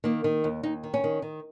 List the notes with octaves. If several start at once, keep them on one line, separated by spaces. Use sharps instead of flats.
D#3 A#3
D#3
D#2
D#2 D#4
D#3
C#4
D#3
D#3